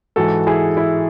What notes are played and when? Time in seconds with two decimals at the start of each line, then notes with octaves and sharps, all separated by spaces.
0.16 G#2 E3 F#4 A4
0.47 E4 G#4
0.77 E4